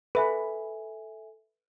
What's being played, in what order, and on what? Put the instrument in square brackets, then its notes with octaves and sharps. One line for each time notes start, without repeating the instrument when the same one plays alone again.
[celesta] A4 E5 G#5 [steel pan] B4